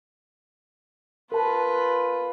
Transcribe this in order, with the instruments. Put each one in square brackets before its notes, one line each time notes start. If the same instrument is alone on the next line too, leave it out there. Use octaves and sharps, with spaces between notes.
[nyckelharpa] F4 B4 [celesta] A#4 A5